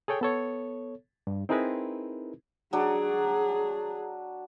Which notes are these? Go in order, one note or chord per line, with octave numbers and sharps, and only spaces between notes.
G#4 A4 C#5 G5
B3 A4 C#5
G2
C4 D#4 E4 G#4 A#4 B4
F#3 D4 G#4